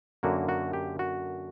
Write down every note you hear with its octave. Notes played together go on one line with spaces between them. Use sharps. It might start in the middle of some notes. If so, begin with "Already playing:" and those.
F#2 D3 A#3 F#4
F#4
G4
F#4